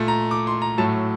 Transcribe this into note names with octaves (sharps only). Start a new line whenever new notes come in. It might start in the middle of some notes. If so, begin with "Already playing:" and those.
Already playing: A#2 A3
A#5
D6
C6
A#5
A2 F#3 A3 A5